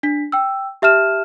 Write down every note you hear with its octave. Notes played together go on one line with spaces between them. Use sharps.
D4 B6
G5 E6
G4 E5 A5 F6 E7